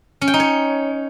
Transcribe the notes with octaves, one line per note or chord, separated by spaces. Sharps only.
C#4
G5
D#4
C#5